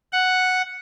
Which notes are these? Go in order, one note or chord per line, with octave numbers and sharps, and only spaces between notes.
F#5